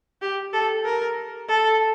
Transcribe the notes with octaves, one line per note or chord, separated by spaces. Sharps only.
G4
A4
A#4
A4